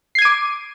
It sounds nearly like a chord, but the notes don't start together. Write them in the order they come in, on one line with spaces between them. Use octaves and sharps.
C7 G#6 D#7 D6